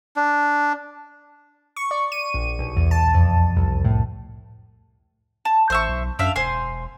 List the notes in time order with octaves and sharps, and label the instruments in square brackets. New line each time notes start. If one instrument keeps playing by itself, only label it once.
[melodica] D4
[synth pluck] C#6
D5
D#7
A#1
B1
E2
A5
F2
C2
A2
[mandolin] A5
[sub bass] A1 [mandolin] C5 E5 C#6
[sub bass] B1
[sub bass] F#2 [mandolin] D4 E5 F5
[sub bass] E1 [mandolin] C5 G#5 C6